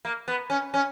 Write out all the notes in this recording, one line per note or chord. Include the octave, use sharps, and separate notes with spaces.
A#3
B3
C#4
C#4